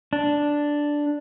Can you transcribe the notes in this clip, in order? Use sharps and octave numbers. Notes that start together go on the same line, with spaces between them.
D4